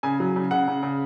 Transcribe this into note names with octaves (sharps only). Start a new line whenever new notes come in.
C#3 G#5
F#3
C#3
C#3 F#5
C#3
C#3